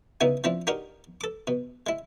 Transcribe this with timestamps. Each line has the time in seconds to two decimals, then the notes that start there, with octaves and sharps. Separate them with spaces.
0.21 C#3 B3 D#4 E4 F#4
0.44 F3 C4 D4 E4
0.67 D4 D#4 F#4 G4 A#4
1.21 A4 D6
1.47 B2
1.87 G#3 E4